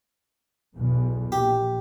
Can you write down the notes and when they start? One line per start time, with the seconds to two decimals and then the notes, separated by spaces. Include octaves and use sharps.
0.76 B1 E2 B2
1.32 A#1 G4